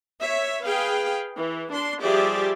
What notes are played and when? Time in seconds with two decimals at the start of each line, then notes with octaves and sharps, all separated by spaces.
0.21 C#5 E5
0.65 G#4 B4 F5 G5
1.37 E3
1.72 D4 C6
2.02 F3 G3 G4 G#4 D5 E5